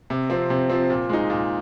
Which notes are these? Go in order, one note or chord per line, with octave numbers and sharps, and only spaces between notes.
C3
F3 C4
C3
F3 C4
A#2
G#3 D#4
A#2